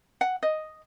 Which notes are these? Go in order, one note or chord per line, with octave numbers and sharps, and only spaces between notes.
F#5
D#5